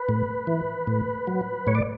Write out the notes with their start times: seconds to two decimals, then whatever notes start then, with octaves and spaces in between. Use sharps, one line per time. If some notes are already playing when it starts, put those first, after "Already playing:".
Already playing: B4
0.09 A2
0.47 E3
0.87 A2
1.27 F#3
1.67 A2 C#5
1.75 D5